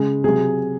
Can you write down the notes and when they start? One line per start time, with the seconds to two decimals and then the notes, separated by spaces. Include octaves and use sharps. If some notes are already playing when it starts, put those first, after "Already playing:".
Already playing: C#3 G#3
0.24 C3 F#3 G#4